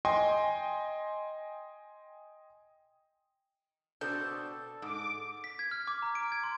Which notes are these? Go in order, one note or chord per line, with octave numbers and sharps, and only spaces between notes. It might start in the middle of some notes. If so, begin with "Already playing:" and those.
D#5 G5 G#5 C6
B2 C4 D4 A4 G6
G#2 D6
B6
G#6
F6
D6
A#5
D7
G#6
C6